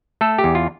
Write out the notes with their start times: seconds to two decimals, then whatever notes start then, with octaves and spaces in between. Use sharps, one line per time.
0.21 A3 A4
0.38 G4
0.44 E2
0.55 F4